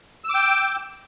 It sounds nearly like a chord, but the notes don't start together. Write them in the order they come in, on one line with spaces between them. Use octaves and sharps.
E6 D6 G5